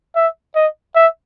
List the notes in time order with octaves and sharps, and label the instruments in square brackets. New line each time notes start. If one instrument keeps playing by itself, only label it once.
[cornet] E5
D#5
E5